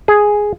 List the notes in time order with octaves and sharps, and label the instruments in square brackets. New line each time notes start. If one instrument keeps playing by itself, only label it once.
[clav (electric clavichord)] G#4